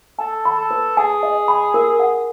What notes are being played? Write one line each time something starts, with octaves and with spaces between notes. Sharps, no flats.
A4 G#5
B5
A4
B4
G#4 G#5
D#5
B5
A#4
F#5